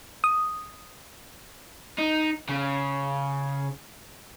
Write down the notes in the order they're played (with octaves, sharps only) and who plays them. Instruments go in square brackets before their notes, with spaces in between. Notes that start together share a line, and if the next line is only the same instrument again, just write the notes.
[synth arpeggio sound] D#6
[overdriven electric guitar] D#4
C#3